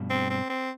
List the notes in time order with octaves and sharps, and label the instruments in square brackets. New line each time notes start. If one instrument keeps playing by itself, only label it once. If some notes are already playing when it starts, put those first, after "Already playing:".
Already playing: [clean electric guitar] G2 B2
[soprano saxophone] C4
C4
C4